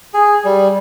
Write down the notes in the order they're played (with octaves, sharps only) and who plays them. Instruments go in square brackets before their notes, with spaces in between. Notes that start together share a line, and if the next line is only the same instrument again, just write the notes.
[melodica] G#4
G3